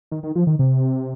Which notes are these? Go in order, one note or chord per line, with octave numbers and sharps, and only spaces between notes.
D#3
D#3
F3
D#3
C3